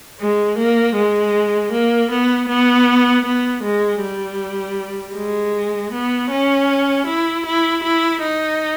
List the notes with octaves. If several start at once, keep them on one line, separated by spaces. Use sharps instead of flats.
G#3
A#3
G#3
A#3
B3
B3
B3
G#3
G3
G#3
B3
C#4
E4
E4
E4
D#4